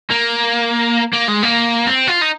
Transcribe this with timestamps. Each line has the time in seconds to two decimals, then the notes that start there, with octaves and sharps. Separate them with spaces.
0.11 A#3
1.13 A#3
1.28 G#3
1.43 A#3
1.87 C4
2.08 F4
2.22 D#4